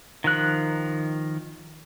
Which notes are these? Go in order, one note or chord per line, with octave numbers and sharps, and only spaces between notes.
D#3 F3 F#6